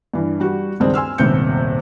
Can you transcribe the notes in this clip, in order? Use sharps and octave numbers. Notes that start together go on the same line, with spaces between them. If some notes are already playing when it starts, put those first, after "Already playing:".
G2 E3
G3 F#4 G4
C#2 G2 D#3 C4 D4 G#4
G#5 C6 E6 F6
D#1 G#1 C3 B3 G6 C#7